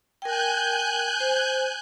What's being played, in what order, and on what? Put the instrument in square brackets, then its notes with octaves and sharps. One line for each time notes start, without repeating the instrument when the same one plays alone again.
[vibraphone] A#4 G5 [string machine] G#5 F#6 G6
[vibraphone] C5